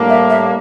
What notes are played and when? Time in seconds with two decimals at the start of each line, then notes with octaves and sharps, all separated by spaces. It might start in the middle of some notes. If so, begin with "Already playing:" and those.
Already playing: A2 G3 A#3 D4
0.09 E5
0.30 E5